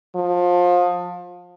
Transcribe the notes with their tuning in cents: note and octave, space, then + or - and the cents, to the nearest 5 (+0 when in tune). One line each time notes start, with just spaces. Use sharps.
F3 +25